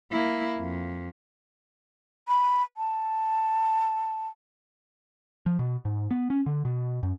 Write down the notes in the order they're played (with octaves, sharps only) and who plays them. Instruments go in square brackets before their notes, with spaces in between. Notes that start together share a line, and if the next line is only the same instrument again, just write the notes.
[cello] A#3 E4
F2
[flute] B5
A5
[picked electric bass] F3
B2
G#2
B3
C#4
D3
B2
F#2